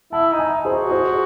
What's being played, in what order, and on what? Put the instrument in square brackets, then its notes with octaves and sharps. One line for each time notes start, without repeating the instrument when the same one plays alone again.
[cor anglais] E4 [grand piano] F#5 A5
[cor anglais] D#4
[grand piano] E5 G#5
G#4 C5
[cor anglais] F#4
[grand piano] G#4 C5